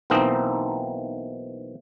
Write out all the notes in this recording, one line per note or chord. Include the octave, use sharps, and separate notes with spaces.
B1 E3 A#3 C4 D#4 D#5